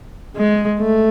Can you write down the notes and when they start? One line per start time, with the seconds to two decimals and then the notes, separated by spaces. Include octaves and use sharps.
0.37 G#3
0.80 A3